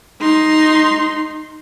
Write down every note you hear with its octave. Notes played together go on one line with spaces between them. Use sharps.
D#4 C6